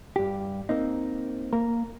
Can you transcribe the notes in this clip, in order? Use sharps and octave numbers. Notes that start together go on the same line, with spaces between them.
G2 G4
A#3 C4 D#4
A#3 A#4